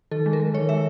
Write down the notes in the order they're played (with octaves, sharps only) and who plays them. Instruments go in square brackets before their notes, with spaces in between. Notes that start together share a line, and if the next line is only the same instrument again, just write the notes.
[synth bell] D#3 A4
G#3
A#4
G#3
D#3 C#5
G#3 E5